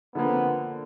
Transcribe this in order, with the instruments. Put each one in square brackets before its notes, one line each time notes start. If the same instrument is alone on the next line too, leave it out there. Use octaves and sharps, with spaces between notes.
[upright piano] D3 F3 A#3 [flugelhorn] B3